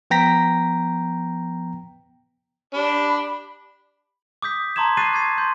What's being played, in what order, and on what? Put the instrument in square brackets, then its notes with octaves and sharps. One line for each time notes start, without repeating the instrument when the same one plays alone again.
[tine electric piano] F3 B3 G5 A#5 A#6 B6
[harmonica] D4 [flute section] G4 B5
[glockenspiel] D6 D#6 G6 B6
A5 A#5 C6 D6 G#6 E7
C#6 D6 F#6 A6 C7 D#7
D6 G#6 C7 D#7
C6 G6